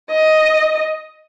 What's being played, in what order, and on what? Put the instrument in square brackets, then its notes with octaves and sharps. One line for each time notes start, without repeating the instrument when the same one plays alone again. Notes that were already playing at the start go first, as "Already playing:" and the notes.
[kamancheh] D#5